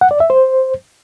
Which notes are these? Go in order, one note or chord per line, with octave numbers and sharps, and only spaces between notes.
F#5
D5
E5
C5